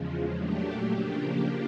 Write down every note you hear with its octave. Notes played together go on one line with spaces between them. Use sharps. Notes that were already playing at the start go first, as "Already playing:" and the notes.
Already playing: E2 C#3 F3 G#3
A#2 F#3 A3 D4 G4
C#3 F3 A#3 D4 G4